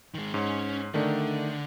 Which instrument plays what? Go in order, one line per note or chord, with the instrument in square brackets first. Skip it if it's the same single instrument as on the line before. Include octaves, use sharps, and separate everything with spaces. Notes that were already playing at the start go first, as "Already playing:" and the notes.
[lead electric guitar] D#3 G#3
[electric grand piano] G#2 [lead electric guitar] C#4
[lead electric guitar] D3 [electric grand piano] D#3 A3 D4